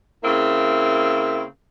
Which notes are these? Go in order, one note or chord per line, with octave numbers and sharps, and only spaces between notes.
C#3 A#3 C4 E4